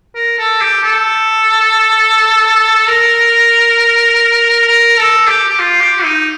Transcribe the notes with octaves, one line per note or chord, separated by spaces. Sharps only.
A#4
A4
G4
A4
A#4
A#4
A4
G4
G4
F4
G4
D#4